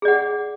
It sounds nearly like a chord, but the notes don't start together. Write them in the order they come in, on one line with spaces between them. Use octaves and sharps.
G#4 D5 F#5